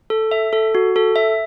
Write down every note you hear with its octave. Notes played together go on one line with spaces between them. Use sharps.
A4
E5
A4
F#4
A4
E5